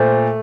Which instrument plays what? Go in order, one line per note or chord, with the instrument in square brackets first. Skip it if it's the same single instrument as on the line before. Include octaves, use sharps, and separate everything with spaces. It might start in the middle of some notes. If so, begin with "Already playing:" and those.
Already playing: [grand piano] A#2 A3 [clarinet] C5